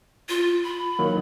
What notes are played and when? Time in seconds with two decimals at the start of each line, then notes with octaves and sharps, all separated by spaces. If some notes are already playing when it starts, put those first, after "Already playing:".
0.29 F4
0.64 B5
0.99 D#3 F#3 A#3